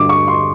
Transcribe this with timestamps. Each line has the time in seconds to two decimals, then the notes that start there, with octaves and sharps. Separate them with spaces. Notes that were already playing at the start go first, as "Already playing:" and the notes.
Already playing: G2 D3 G3 D6
0.09 C#6
0.28 C6